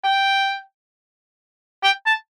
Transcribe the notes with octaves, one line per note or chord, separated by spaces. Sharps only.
G5
G5
A5